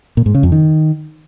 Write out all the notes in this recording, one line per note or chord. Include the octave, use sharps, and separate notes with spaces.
A#2
G#2
C#3
F2
D#3